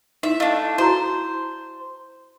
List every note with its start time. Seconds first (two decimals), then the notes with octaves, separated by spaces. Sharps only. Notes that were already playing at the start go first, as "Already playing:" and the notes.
0.23 D#4 E4 E5
0.40 A3 D4 E4 D#5 F5
0.78 E4 F#4 C5 A#5